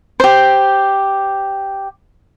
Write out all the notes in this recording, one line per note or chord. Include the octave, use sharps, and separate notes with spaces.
G4 C5